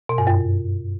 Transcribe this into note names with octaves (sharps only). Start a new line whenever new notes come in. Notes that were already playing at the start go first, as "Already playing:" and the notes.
B2
G2
F#2